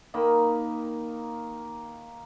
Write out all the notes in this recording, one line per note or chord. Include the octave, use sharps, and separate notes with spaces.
D#3 A#3 B5